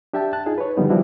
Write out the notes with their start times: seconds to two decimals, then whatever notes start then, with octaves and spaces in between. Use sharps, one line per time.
0.13 D4 G4 E5 G5 A5
0.33 A5 F#6
0.46 D#4 F4 G#4
0.58 B4 C#5
0.77 D3 F3 G3 B3 D#4
0.89 F3 G3 D4 E4 F#4